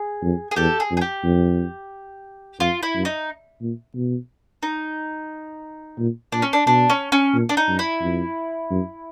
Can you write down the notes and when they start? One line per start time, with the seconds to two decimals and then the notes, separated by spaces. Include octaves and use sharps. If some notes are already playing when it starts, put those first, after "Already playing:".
Already playing: G#4
0.23 F2
0.51 G#4
0.56 E2 G4 A4
0.80 G#4
0.91 F2
0.97 G#4
1.01 G4
1.24 F2
2.60 F2 F4
2.83 E4
2.94 F#2
3.05 D#4
3.61 A#2
3.95 B2
4.63 D#4
5.98 A#2
6.32 A#2 D4
6.42 C#4
6.53 D4
6.67 B2 D4
6.90 C#4
7.12 C#4
7.34 A#2
7.49 D4
7.57 D#4
7.68 F#2
7.79 E4
8.02 F2
8.70 F#2